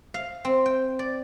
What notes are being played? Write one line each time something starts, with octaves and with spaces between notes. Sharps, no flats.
F5
C4
G5
D5